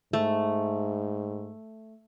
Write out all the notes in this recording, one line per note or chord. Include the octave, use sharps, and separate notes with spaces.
G#2 A3